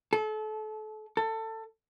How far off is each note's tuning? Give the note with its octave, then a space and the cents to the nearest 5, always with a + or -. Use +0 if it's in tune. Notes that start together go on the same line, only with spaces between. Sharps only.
A4 -30
A4 +20